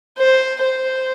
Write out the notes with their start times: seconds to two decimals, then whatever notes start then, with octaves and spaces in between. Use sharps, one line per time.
0.18 C5
0.61 C5